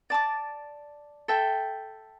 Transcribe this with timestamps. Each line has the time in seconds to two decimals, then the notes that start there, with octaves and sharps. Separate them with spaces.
0.10 D5 A5 D6
1.28 A4 E5 G5